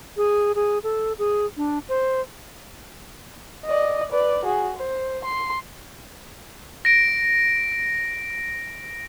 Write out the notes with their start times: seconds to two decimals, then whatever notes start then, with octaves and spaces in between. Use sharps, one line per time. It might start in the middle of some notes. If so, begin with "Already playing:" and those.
0.17 G#4
0.55 G#4
0.83 A4
1.19 G#4
1.57 D4
1.89 C5
3.66 D5 D#5
4.11 B4 D5
4.44 F#4 G#4
4.76 C5
5.25 C6
6.85 A#6 D7